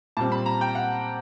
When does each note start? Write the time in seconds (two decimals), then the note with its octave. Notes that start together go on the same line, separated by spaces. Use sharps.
0.17 A#2 G3 C4 A5
0.32 B5
0.46 A#5
0.61 G5
0.75 F#5